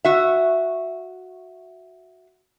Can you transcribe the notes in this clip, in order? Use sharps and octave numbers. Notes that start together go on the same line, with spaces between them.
F#4 E5